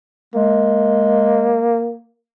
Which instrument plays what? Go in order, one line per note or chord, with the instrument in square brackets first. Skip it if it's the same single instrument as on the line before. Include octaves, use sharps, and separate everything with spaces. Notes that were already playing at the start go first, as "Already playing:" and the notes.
[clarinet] G#3 [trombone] A#3